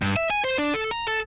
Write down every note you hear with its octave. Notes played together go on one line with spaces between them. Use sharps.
G2
E5
G#5
C5
D4
A4
A#5
A4